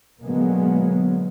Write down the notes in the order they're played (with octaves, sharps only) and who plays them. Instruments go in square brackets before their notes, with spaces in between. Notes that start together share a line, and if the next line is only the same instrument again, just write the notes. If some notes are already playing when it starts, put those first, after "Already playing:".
[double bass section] B2 D3 F#3 G#3 A#3 B3